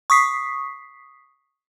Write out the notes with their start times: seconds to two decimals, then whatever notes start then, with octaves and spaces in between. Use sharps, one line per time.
0.10 C#6 D#6 B6 C7